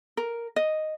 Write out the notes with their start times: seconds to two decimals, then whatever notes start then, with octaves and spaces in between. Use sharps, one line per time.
0.17 A#4
0.56 D#5